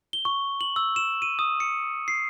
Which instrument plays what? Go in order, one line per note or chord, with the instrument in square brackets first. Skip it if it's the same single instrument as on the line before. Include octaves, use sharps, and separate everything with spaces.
[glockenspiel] G7
C#6
F#7
E6
E7
D#7
D#6
C#7
C7